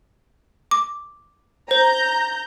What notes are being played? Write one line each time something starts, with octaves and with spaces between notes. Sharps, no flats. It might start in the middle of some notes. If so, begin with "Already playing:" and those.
D6
C5 A#5 G6